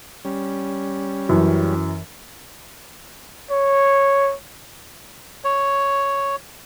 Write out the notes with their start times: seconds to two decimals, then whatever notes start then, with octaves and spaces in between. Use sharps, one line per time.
0.25 G3 C#4
1.29 F#2 E3
3.51 C#5
5.44 C#5